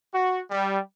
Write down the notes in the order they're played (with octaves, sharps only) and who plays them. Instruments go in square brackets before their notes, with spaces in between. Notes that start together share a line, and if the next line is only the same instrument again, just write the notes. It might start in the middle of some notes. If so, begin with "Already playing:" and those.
[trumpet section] F#4
G3